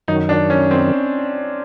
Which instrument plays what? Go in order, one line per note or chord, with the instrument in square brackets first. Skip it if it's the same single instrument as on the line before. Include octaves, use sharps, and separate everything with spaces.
[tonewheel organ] F#2 D#3 F#3 [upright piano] D#4
[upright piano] D4
C#4
C4